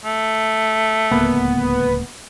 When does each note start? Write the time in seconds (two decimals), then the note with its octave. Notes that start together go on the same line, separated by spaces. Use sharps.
0.05 A3
1.11 D1 C#2 A#3 B3